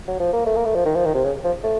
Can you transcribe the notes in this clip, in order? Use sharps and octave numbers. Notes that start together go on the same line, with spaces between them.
F#3
F3
A#3
A3
A#3
A3
F3
D#3
F3
D#3
C3
C#3
F3
A3